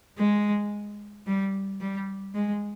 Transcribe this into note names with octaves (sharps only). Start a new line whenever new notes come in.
G#3
G3
G3
G#3